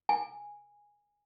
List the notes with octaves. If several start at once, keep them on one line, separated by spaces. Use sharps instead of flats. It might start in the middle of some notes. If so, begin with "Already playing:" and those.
G#5